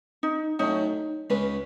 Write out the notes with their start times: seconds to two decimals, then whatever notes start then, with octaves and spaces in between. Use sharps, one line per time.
0.23 D#4
0.59 A2 F#3 C#4 D#4
1.30 C#2 C#3 G#3 C#4 B4